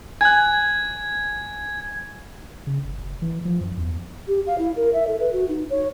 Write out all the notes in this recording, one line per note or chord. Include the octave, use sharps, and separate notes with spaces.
G#5 F#6 G#6
C#3
G1
F#1
E3
F3
F#2
E2
G4
F5
E4
A#4
E5
A4
B4
F#4
D#4
C#5